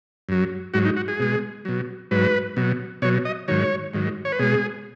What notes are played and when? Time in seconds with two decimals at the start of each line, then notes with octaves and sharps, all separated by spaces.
0.29 F#2 F#3
0.74 G#2 F#3 F#4
0.85 D#4
0.97 F#4
1.08 G#4
1.20 B2 G#3
1.65 B2 F#3
2.11 G#2 F#3 B4
2.57 B2 F#3
3.02 B2 F#3 C#5
3.25 D#5
3.48 G#2 D#3 F#3 C#5
3.94 G#2 D#3 F#3
4.25 C#5
4.32 B4
4.39 B2 G#3 G#4